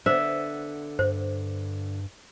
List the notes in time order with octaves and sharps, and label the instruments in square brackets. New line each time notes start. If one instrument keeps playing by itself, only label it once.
[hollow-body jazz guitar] D3 B3 [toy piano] C5 [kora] E5
[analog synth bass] G2 [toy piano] C5